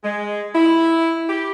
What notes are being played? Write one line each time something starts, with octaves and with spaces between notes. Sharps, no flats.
G#3
E4
G4